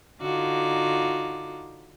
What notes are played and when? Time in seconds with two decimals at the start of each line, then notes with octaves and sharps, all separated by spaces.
0.21 D3 D#4 F4 F#4 D6